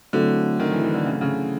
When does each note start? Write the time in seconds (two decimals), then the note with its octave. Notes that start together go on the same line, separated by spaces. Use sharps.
0.13 D3 F#3 A3 C4 E4 A4
0.59 D#3
0.72 E3
0.83 E3
0.94 D3
1.06 C#3
1.13 D3
1.21 C#3